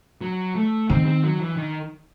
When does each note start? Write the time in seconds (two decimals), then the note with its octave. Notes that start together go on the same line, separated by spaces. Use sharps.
0.21 F#3
0.56 A3
0.89 D#3 C4
1.06 C4
1.24 F#3
1.39 E3
1.57 D#3